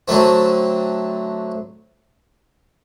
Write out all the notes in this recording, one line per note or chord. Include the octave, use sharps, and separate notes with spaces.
D3 F#3 A3 C4